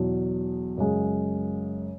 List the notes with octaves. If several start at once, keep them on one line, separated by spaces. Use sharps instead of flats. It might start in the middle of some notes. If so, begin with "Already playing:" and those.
Already playing: E2 B2 F#3
F#2 C#3 G#3